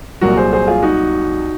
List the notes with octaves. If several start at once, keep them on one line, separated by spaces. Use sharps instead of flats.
C2 A#2 F#3 F#4 A#4
G#4 C5
G#4 C5
F4 G#4
D#4 F#4